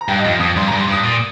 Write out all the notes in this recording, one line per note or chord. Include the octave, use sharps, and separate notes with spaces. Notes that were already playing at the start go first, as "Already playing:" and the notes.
A#5
G2 G5
D#5
F2 F5
F2 D#6
G2 C6
A#5
G2
C6
G2 D#6
A#2